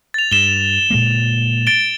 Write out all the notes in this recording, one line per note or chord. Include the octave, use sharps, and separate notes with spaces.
A6 F7
G2 E7 G7
A#2 G#3 A#3
A6 D7 G7